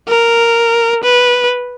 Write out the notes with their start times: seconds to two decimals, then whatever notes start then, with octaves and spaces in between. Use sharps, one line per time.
0.08 A#4
1.03 B4